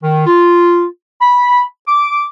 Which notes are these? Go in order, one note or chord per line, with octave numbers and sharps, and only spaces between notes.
D#3
F4
B5
D6